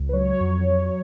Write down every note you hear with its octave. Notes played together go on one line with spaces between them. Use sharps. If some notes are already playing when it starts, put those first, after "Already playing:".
Already playing: C#2
B4
F#3 C#5
F2
F#3